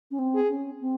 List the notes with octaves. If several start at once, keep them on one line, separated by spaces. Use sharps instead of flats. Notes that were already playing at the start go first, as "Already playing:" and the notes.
C#4
C4
G#4
C#4
C4